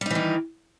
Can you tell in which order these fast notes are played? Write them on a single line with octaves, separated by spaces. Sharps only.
G3 D#4 E3 D#3